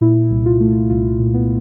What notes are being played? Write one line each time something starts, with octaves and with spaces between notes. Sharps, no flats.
A#2 E4
C2
F4
A3
C2 F4
A#2
B3